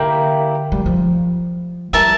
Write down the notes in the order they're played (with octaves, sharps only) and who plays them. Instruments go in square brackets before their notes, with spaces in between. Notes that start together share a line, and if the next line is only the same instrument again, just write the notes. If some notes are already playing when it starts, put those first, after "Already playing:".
Already playing: [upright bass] D3 [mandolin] A#3 E4 G4
[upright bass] G3
F3
[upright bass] G3 [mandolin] E4 A#4 E5 A5